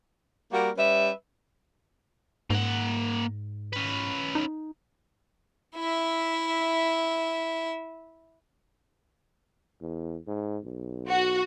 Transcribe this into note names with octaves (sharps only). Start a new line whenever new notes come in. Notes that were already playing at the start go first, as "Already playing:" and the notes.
G3 A#3 F#4 A#4
G3 C#4 B4 E5
G#2 A#3 F#5
C#4 B4
D#4
E4 E5
E2
G#2
B1
F#4